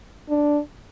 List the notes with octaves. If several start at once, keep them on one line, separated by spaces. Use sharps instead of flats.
D4